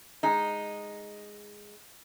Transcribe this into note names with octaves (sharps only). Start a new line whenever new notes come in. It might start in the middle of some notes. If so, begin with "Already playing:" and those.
G#3 D#4